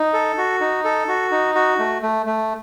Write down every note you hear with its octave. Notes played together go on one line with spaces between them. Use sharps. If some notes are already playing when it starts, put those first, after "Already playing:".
Already playing: D#4
A4
F#4
D#4
A4
F#4
D#4
F#4
A3
A3
A3